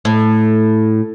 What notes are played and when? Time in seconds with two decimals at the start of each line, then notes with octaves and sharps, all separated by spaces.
0.05 A2